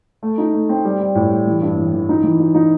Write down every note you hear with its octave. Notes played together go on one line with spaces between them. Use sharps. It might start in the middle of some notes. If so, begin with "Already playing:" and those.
A3
D#4
A3
C4
G3
G3
A2
G3
E3
G2
E3
E3
D#4
E3
D#4
D#4